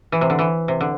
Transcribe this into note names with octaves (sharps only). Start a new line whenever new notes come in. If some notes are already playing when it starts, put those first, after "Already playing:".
E3
C3
D3
E3
C3
D3